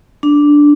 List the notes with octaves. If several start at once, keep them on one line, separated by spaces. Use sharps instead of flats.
D4